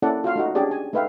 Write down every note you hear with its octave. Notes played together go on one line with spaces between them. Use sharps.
A#3 C#4 E4 A4 D5 F#5
F4 F#4 F5
A3 D#4 F#4
C#4 D4 G4 G#4 D5
G#5
A3 D#4 B4 E5 F5 G5